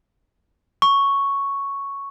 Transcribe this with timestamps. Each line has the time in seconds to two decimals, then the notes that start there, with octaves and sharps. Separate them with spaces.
0.82 C#6